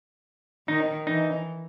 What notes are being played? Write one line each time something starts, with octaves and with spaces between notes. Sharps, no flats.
D#3 D#4
E3 D#4